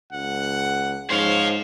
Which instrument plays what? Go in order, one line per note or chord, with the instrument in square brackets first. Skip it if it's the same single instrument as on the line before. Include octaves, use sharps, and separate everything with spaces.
[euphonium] C#2 [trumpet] F#5
[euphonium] G#2 [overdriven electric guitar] C5 F5 [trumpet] C#5